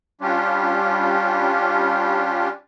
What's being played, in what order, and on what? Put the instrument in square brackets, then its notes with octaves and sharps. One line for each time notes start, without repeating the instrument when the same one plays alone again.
[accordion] G3 C#4 D4 F4 G4